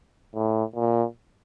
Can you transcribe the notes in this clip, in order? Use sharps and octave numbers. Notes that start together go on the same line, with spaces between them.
A2
A#2